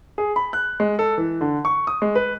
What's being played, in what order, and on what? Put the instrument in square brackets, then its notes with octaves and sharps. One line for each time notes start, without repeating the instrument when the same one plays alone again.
[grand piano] G#4
B5
F#6
G#3
A4
E3
D3
C#6
D#6
G#3
B4